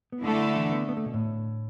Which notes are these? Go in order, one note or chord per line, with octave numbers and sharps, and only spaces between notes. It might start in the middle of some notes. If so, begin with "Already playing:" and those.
B3
D3 A3 D4 E4 A4
E3
B3
B3
A3
B2
A2